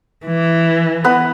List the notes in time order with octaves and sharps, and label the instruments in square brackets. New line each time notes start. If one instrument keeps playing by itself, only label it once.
[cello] E3
[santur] B3 B4